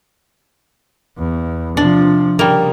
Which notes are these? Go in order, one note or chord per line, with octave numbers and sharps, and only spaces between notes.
E2
C3 F3 D4
C#3 G3 A#3